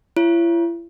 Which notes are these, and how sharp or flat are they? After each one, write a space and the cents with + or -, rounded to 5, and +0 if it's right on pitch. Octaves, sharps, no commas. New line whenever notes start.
E4 +40 C#5 +0